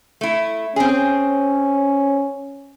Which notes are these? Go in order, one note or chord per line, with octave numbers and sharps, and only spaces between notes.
A3 E4
C4 C#4 G#4